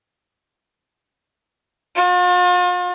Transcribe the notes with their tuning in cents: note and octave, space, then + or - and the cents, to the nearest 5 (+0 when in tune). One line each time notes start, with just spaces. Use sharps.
F4 +45